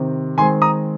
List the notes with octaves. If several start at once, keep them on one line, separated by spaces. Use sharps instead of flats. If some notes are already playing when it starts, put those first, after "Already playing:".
Already playing: C3 D#3 C4
D#3 G#3 C4 G#5 C6
A#5 D#6